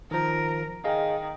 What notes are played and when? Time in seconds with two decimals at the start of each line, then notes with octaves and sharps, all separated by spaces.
0.11 D#3 F3 A#4
0.84 D#3 G#4 D#5 F5